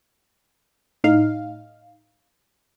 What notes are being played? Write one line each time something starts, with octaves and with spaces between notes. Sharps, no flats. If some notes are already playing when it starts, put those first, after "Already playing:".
A2 D#4 F5